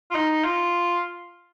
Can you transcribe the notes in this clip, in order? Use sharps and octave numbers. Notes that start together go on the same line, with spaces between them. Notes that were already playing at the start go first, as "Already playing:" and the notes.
F4
D#4
F4